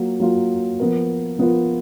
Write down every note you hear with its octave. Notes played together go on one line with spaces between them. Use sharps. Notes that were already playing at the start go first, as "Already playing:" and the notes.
Already playing: F#3 A#3 F4
F#3 A#3 F4
F3 B3 F4 A#4
F3 B3 F4 A#4